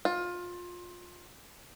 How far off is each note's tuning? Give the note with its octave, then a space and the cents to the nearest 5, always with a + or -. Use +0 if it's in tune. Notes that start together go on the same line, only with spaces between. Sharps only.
F4 +20